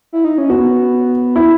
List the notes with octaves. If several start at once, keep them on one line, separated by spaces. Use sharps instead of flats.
E4
D#4
C#4
B3 F#4
E4